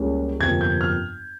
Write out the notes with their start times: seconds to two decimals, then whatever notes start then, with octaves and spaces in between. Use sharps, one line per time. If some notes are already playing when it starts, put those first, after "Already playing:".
Already playing: C#2 C#3 G3 A#3 C#4
0.40 G1 F2 C3 F3 A#3 G#6
0.61 G6
0.81 F6